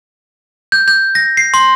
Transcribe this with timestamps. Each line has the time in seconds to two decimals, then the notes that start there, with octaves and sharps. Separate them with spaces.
0.72 G6
0.88 G6
1.15 A#6
1.37 C7
1.54 C6